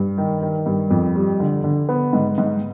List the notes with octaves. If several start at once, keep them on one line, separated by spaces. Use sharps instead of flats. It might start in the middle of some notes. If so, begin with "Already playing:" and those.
Already playing: G2
D#3
D#3
G2
F2
G3
D3
D3
B3
G#2
G#2